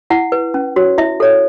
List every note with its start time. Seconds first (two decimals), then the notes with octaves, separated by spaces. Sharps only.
0.10 E4 F#5
0.32 B4
0.54 C#4
0.76 F#4 C#5
0.98 E4 E5
1.20 A4 C#5